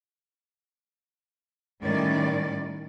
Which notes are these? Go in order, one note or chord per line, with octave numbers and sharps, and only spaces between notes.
A2 D#3 G3 C#4 D5